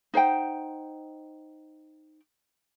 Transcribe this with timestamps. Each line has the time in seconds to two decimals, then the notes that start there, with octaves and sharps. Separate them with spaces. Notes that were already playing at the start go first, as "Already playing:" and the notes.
0.14 D#4 C5 F#5 G5